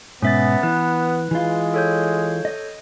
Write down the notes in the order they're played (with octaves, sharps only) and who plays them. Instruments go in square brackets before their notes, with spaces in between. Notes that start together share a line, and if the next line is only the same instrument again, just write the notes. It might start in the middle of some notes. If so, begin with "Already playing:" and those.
[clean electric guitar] G#2 B2 [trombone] B3 [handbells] C#4 E5 A6
[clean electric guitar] E3 [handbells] B4
[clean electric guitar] E3 F4 [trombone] G#3
[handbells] A4 C#5 G6
[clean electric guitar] D#5